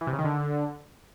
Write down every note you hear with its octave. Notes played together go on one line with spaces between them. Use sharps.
E3
C3
C#3
D#3
D3